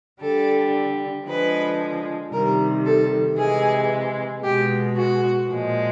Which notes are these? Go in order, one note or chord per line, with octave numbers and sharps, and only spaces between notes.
D3 G3 A4
D3 F3 G#3 B4
C3 D#3 G3 A#4
A4
C3 E3 G#3 G#4
B2 G#3 G4
F#4
A#2 F3 G#3